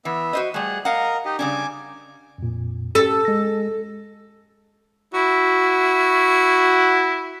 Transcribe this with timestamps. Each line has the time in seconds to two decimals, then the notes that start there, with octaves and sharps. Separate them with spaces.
0.05 E3 B3 E5
0.33 F#4 C5 D#5
0.54 G3 A3 G#4 F#5
0.85 A#4 D#5 F5 F#5 A#5
1.25 D#4 G4 D#5
1.39 C#3 G3 D4 G#5 D6
2.38 F2 A#2
2.95 C#4 G4 A4
3.25 G#3 A#6
5.14 E4 F#4